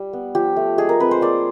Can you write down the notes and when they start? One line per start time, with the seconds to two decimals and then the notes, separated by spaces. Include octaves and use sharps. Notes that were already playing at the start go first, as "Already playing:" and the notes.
Already playing: G3
0.13 B3
0.35 F3 G4
0.57 A3
0.78 G#3 G#4
0.89 A#4
1.00 C4 B4
1.11 C5
1.22 A#3 D5